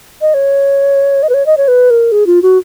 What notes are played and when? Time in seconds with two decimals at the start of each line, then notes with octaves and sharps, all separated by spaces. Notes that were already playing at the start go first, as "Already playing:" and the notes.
0.21 D#5
0.34 C#5
1.23 D#5
1.29 B4
1.34 C#5
1.46 D#5
1.57 C#5
1.68 B4
1.90 A#4
2.12 G#4
2.27 F4
2.42 F#4